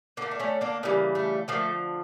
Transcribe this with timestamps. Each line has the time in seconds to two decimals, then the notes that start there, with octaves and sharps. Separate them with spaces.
0.17 D3 A3 A#3
0.31 D4
0.39 A3 C#4
0.61 A#3 D4
0.83 C#3 E3 G3 A#3
1.15 A3
1.48 D3 F3 A3 A#3